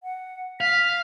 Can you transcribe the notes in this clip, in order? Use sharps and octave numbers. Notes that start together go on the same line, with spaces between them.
F#5
F5 B6